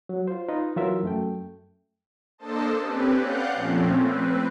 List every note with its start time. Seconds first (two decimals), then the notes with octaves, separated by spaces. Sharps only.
0.09 F#3
0.28 F4 C5
0.49 D#4 F4 B4 D#5
0.76 E3 F#3 F4 A#4 E5
1.03 F#2 A3 G5
2.38 A#3 D4 A4 C5 D#5 A5
2.80 C4 C#4 G4 B4
3.16 D5 F5 F#5 F#6 G6
3.54 A#2 F3 A3 C4 C#4
3.99 C4 B4